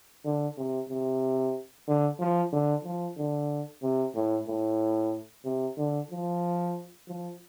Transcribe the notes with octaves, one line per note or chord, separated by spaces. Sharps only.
D3
C3
C3
D3
F3
D3
F3
D3
C3
A2
A2
C3
D3
F3
F3